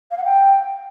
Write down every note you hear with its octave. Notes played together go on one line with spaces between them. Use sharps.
F5
F#5
G5